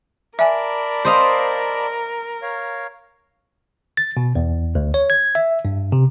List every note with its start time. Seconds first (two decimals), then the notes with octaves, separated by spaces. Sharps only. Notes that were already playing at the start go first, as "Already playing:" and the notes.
0.39 A#4 D5 E5 G#5 A5 B5
1.05 C5 D#5 F5
2.42 C#5 F5
3.97 A6
4.17 B2
4.35 E2
4.75 D2
4.94 C#5
5.10 G#6
5.35 E5
5.65 G2
5.92 C3